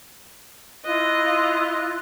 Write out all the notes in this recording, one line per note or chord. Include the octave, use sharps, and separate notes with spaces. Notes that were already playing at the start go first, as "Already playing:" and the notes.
E4 F4 D#5 F#6